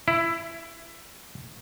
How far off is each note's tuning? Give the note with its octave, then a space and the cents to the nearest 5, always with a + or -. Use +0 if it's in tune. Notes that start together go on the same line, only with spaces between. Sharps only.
E4 +15